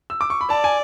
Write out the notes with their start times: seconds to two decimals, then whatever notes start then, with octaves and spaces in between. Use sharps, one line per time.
0.10 E6
0.21 D6
0.30 C#6
0.41 B5
0.50 D5 A5
0.64 G#5